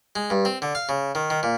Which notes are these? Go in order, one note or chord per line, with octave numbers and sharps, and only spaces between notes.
G#3
G2
C4
D3
F5
C#3
D#3
D#3
A#2